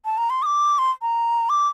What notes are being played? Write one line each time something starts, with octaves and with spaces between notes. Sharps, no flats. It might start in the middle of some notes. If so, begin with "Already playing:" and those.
A5
A#5
C6
D#6
D6
C6
A#5
D6